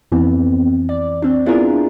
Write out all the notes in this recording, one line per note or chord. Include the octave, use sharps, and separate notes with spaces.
F2 E3 B3 C4
D5
C4 D4
B3 D4 E4 F4 G#4 A#4